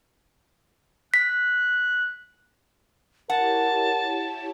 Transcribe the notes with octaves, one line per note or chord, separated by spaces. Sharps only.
F#6 B6
E4 G4 A#4 C#5 F#5 A5